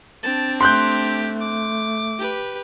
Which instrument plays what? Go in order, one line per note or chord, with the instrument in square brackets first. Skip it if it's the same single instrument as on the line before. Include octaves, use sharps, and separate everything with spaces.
[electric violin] C4 D4 [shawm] A5
[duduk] A3 [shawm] G4 [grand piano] C6 F#6 G6
[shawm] D6
[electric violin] G4 B4